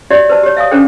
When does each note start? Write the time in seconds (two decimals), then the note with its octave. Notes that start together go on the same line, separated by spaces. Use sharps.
0.11 F#4 G4 C#5 D5 E5
0.30 B4 C5 A5
0.43 G4 C#5
0.57 E5 F5 G#5 D#6
0.71 C#4 D4 G#4 A4 C5 G5